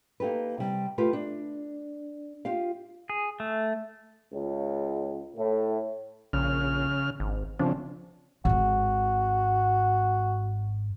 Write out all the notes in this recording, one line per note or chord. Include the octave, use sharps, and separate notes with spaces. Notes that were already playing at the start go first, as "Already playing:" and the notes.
A#3 D#4 G4 A4 B4
C3 G3
A3 F4 G4 B4
D4
F4 G4 F5
G#4
A3
C#2
A2
A#1 C#3 F6
G#1
C#3 F3 C4 D4
G#1 G#2 F#4